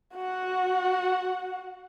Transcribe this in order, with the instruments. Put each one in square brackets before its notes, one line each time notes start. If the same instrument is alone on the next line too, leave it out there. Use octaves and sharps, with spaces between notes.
[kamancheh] F#4 F#5